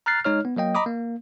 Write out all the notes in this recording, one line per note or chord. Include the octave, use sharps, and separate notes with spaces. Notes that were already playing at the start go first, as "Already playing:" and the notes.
A#5 F6 F#6 A6 C7
G#3 D#4 C#5 F6
B3
F#3 A#3 D#5 G5
D#5 A#5 B5 D6 D#6
A#3